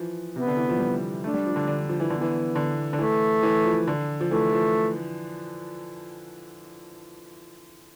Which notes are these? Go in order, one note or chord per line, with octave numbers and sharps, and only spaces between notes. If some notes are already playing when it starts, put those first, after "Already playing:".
Already playing: E3 F3
C3 B3
D3
E3
F3
G3
A3 D4
G3
F3
D3
D3
F3
E3
D3 B3
E3
D3
D3
E3 A3
E3
F3
D3
F3
E3 A3
F3